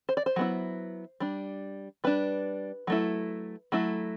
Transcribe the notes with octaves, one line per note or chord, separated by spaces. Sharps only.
C5
D5
C5
F#3 B3 E4
G3 D4
G3 D4 B4
F#3 A3 E4
F#3 A3 E4